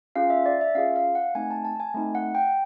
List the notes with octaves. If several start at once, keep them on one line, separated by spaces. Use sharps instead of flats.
C#4 F4 G#4 F5
E5
D5
E5
C#4 F4 G#4 F5
F5
F#5
A3 C4 D#4 G#5
A5
A5
G#5
A3 C4 D#4
F#5
G5